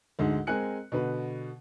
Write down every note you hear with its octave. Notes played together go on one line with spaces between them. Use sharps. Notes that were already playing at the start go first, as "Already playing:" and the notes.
D2 G#2 G#3
G#3 C4 A#4 G#5 F#6 C#7
B2 D3 B4